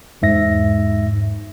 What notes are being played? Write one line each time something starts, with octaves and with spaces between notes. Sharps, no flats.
E2 G#2 E5 A#6